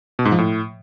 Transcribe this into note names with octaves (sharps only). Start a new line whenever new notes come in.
B2
G#2
F3
A2